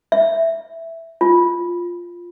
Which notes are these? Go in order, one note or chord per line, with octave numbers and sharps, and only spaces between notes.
E5
F4